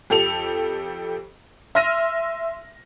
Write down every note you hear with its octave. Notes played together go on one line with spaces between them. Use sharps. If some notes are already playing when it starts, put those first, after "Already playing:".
F2 G4 A4 F7
E5 C6 E6 F6 A#6 D#7